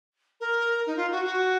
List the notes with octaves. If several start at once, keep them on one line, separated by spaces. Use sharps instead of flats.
A#4
D#4
F4
F#4
F#4